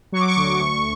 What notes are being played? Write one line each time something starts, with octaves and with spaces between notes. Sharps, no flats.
F#3 C#6
D6
C#6
D2
D2